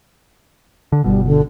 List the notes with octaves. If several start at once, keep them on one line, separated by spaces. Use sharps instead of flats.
D3
G1 B2 G3
D3